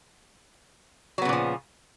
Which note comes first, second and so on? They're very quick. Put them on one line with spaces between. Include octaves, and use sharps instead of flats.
F#3 B3 C#3 A#2 F3